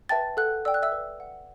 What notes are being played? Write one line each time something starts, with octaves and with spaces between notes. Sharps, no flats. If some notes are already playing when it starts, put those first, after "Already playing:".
B4 E5 G5 A5 A6
A4 F#5 F#6
D5 G5 E6
F#6
E5 E6
B4
F#5